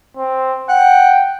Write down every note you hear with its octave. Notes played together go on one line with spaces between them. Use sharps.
C4
F#5 G5